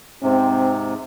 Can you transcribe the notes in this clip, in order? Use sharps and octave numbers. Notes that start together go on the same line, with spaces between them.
G#2 C3 C4